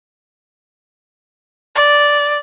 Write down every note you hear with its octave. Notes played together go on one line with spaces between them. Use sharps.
D5